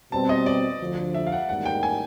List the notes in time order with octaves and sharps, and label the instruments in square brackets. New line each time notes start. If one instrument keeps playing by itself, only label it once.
[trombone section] B2 G3 C4 [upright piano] A5
[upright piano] D#5
D5
[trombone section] D2 D3 F3
[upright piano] E5
F5
F#5
[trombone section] A1 G#2 D#3 G3 A#3 [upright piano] F#5
[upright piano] G5
G#5